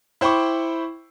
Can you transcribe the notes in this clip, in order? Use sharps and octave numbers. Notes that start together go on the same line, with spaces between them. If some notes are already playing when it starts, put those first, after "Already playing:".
E4 C5 G5 B5 C#6 D6